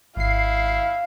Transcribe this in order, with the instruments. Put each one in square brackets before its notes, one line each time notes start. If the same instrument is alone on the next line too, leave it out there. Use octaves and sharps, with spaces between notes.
[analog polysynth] G#1 C7 [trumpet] E4 [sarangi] F5